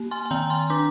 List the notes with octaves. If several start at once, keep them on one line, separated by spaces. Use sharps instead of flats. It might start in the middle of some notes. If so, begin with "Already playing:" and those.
Already playing: A#3
G#5 C6
G#5
D#3 G5 A#5
G#5 C6
D4 A#5 D6